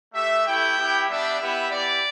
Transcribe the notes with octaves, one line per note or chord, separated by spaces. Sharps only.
A3 G4 E5
A3 E4 G4 G5
B3 E4 G4
G3 B3 D4 G4 E5
B3 E4 G4 E5
B3 E4 G4 D5